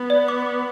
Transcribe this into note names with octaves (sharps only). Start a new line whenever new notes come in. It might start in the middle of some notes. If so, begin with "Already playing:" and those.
Already playing: B3
D5
D6
D6